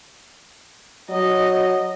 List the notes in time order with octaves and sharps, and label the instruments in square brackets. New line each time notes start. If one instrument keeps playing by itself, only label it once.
[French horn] F#3 [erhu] D#5